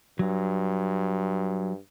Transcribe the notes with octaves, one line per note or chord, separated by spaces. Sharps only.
G2 F#3